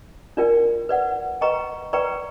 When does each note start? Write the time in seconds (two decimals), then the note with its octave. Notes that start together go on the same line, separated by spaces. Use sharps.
0.37 D4 F4 A#4 D5 G5
0.89 B4 D5 F#5
1.41 B4 D#5 G5 A#5 C#6
1.93 B4 D5 G5 A#5 C#6